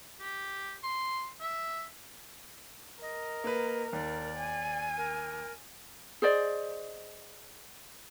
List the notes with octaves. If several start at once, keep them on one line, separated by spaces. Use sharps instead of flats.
G4
C6
E5
A#4 D#5
A#3 B4
D#2 D5
G#5
A#4
G#4 C5 D5 D#5